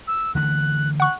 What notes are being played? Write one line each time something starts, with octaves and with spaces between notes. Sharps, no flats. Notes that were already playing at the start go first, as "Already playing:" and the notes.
E6
D3 E3 A3 F#6
F#5 C#6 F#6